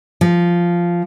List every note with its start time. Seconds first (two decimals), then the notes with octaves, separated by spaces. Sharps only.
0.21 F3